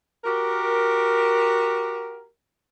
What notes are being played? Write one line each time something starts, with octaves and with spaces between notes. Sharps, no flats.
F#4 G4 A#4